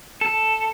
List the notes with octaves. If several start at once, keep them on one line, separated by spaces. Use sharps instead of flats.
A4